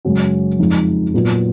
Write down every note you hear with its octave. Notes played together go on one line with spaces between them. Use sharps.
F#2 C#3 G#3 C#4 F#4
F2 F3 G#3 D#4
A#2 F#3 B3 F4